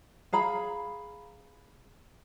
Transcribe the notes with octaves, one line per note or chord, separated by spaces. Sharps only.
G#4 F5 A#5 B5